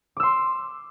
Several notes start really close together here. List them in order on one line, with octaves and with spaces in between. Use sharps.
D6 E6 C6